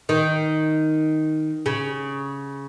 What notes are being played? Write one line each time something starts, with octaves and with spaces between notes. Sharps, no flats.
D#3
C#3